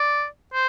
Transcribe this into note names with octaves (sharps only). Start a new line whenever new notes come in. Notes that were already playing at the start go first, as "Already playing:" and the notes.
Already playing: D5
C5